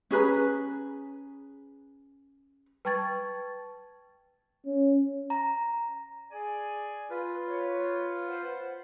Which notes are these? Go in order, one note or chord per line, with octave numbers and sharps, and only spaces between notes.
C#4 G#4 B4 A#5
B4 G5 A5 C#6 G#6 A6
C#4
A#5
G#4 D5 G#5
F4 B4
C#5
C5 F#5